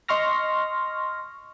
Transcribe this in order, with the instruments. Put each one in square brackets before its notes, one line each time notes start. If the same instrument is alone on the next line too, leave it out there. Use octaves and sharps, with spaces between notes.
[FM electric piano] D#5 C6 C#6 F6 A#6